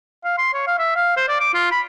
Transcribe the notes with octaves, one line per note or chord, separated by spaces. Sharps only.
F5
C6
C#5
F5
E5
F5
C5
D5
D6
F4
B5